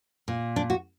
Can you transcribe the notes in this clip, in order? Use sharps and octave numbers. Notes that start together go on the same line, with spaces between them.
A#2
D4
F#4